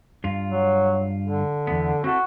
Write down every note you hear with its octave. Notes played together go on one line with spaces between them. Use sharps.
G2 F4
F#3
D3
E2 B3
C4 E4 F#4 A4